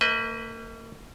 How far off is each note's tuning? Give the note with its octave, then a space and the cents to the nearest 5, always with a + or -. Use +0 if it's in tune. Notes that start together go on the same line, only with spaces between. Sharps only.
A#3 -40 B4 +0 D#5 +35